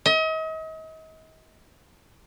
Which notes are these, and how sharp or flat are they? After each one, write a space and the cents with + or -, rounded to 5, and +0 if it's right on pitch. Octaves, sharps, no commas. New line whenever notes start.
D#5 +40